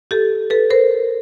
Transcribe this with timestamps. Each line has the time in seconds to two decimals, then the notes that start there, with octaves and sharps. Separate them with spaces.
0.11 G4 A4
0.50 A4 B4
0.70 A#4 C5